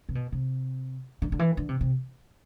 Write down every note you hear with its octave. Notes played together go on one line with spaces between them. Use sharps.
C3
B2
C3
D3
D3
E3
D3
C3
C3